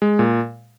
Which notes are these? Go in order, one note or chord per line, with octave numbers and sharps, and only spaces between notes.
G#3
A#2